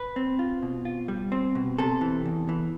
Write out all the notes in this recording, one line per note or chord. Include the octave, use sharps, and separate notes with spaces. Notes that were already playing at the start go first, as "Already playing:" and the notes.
Already playing: B4
C4
F4
B2
F4
G3
C4
B2
C3 A4
E3
E2
E3